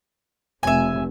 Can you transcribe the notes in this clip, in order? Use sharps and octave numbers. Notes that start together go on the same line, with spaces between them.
F1 E5 G#5